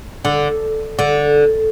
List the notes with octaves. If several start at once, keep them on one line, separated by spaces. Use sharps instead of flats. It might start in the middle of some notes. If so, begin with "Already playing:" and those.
D3
D3